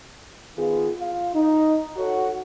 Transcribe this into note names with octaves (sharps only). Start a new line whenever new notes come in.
D#3 B3 F4 G#4
F4 F5
D#4
F#4 A4 C#5 F#5